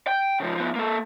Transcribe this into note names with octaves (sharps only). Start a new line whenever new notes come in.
G5
C#3 F3
F3 B3
A#3 A4